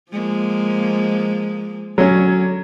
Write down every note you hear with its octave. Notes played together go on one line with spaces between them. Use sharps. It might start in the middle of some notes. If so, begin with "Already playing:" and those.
F3 G#3 A#3
D3 F#3 C#4